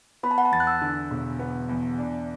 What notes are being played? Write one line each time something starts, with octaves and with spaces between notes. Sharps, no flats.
B3 B5
A5
F#5
A5
E2 A6
F#6
E6
D3
E1
B3
E2
D4